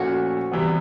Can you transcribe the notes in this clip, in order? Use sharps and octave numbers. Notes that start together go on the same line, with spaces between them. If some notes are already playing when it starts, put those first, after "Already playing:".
Already playing: A#2 F3 A3 C#4 F#4
C3 E3 G3 B3